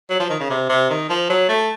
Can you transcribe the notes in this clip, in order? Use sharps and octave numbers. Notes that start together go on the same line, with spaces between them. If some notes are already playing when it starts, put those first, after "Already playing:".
F#3
F3
D#3
C#3
C3
C3
D#3
F3
F#3
A3